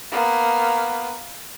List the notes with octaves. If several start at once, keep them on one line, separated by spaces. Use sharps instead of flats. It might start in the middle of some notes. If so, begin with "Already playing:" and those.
A#3 B3